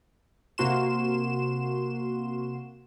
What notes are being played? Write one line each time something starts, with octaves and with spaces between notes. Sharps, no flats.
C3 A#3 F#4 C6 E7